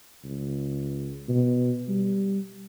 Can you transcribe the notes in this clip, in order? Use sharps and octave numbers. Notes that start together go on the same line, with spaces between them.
C#2
B2
G3